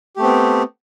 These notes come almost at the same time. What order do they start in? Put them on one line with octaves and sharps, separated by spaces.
G4 A3 C4 B3